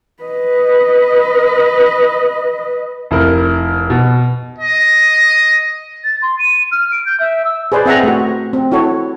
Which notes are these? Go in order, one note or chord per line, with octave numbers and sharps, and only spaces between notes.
B4 D#5
F1 E4 A#4
B2
D#5
A6
C6
D#7
F6
D7
G6
E5
E6
G#4 B4 C5 D5
C4 G#4 E5 F#5 G#5 A#5
A3 F#4
C4
E4 F#4 A4 C#5